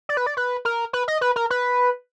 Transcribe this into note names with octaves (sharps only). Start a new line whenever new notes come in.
D5
B4
D5
B4
A#4
B4
D#5
B4
A#4
B4